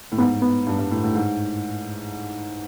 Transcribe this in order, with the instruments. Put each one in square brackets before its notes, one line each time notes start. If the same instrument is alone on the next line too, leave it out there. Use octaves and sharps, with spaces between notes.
[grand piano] A2
[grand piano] G#2 [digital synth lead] B3
[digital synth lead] B3
[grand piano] G2
G2
A2
A2
G#2